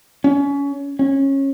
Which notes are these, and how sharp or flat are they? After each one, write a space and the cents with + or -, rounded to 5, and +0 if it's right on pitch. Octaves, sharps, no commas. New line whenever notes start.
C#4 +25
C#4 -20